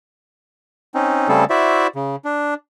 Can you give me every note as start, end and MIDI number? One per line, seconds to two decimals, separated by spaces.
0.95 1.28 60
0.95 1.28 61
0.95 1.28 63
1.29 1.45 49
1.29 1.45 55
1.29 1.45 57
1.29 1.45 60
1.29 1.45 68
1.29 1.45 69
1.50 1.87 64
1.50 1.87 66
1.50 1.87 72
1.50 1.87 74
1.50 1.87 76
1.95 2.16 49
2.25 2.54 62